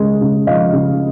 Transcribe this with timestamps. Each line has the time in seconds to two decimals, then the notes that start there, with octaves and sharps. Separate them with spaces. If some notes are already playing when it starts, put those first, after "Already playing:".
Already playing: C#3 G#3
0.21 C#3
0.47 F3 D#5 F5
0.73 C#3